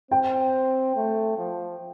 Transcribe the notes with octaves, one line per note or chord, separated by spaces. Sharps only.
C4 G5
A3
F3